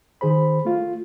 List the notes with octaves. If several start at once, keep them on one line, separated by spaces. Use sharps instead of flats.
D#3 G#4 C5 B5
A3 F4